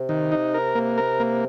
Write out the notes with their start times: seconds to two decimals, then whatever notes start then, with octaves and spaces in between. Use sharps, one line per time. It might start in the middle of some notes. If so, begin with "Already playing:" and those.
Already playing: C3
0.09 D#3
0.32 D#4
0.54 A#4
0.75 A#3
0.98 A#4
1.20 A#3